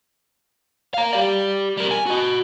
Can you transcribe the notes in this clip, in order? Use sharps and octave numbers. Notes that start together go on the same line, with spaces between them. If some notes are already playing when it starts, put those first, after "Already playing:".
F5 A#5
G4 D5
G3 A#4
G#5
F#4 D#5